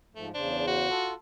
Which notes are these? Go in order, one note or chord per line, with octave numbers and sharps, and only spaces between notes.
G#2 F3 A3
E2 C#3 D4 C5
F#4
F4 A4